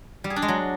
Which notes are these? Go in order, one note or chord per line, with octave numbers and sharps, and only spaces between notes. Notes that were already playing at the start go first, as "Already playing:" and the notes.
G3
G#4
D4
G#3
F#3